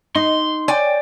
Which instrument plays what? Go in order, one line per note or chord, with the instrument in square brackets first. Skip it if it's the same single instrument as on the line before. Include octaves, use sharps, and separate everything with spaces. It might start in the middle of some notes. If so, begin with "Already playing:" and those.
[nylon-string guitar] D#4 [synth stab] D#5 [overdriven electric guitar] C6
[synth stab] C#5 G5 [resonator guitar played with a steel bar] D5 G#5